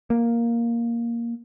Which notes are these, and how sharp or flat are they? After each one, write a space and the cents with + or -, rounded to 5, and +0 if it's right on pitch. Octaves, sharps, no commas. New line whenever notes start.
A#3 +5